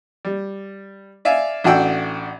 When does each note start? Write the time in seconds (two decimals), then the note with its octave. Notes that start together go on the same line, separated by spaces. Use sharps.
0.25 G3
1.25 D5 E5 F5 G#5
1.64 A1 D4 F#4 F#5 G5 E6